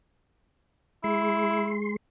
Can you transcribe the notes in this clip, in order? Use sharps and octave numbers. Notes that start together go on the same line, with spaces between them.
G#3 E4 C6